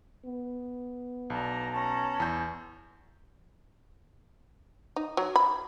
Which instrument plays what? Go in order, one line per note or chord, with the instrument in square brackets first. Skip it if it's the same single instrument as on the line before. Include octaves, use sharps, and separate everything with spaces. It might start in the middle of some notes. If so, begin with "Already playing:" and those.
[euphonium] B3
[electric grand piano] B1 [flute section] D4 A5 A#5
[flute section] C#4 A5 A#5
[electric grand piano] E2 G6
[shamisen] D#4
F#3
B5